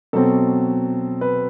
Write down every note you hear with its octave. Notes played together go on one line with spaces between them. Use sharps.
B2 F#3 C4 A4
B4